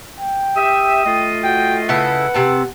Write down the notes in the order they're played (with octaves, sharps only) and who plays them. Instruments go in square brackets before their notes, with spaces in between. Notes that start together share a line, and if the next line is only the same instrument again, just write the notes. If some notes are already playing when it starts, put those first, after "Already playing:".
[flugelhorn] G5
[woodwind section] G4 E5 [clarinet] D#6
[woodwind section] A3 F4 D#5
[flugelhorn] F#4 [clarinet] G5
[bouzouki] C#3 E4 A4 [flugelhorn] B4 [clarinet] F#5
[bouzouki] C3 C4 A5